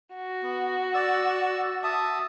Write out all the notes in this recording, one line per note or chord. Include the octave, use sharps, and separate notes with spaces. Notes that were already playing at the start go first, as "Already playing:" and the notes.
F#4
B3
D5 E6
E5 A5 D#6